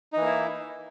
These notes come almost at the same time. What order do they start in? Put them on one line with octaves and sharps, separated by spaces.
D#4 E3 A#3 E4